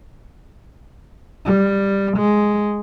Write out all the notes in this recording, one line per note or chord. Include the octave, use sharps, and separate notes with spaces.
G3
G#3